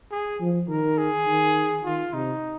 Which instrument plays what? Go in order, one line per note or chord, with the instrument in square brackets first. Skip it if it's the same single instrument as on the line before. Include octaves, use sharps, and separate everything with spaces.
[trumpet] G#4
[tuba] F3
[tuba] D#3 [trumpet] A#4
[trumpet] G#4
[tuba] D#3
[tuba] D#3 [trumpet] F4
[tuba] C3 [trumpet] D#4